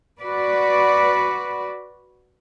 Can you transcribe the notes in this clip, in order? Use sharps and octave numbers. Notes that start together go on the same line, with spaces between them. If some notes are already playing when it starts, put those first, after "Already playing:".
F#4 B4 D5